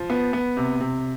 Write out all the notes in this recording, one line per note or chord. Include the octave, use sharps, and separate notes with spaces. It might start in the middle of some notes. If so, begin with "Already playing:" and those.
Already playing: F3
B3
B3
C3
C3